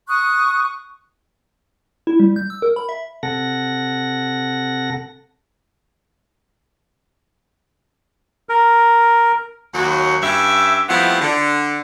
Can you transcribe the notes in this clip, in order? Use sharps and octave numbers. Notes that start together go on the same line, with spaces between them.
C#6 D#6 F#6
E4
G3
G6
E6
A#4
B5
E5
C3 A4 F#5 A#6
A#4
D#2 F#3 F#4
G2 C#4 G4 E5
F3 G3 A3 B3 C4 E4
D3